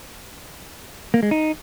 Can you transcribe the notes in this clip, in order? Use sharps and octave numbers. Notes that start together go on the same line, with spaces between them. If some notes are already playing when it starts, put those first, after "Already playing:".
A#3
G#3
D#4